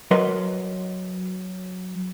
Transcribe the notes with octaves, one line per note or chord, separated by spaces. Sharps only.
F#3 A#4 B4 D#5 C6